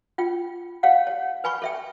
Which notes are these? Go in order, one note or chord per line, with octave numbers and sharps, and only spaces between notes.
F4 G5
G4 C#5 F5 F#5
C#5
B4 G#5 B5 C#6
A4 E5 G5